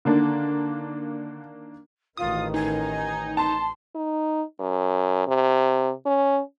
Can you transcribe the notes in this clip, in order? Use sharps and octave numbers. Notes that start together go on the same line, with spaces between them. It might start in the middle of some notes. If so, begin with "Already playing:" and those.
D3 D#3 A#3 D4
A1 D#3 F4 D#6
D#4 G#5
A5 C6
D#4
F#2
C3
C#4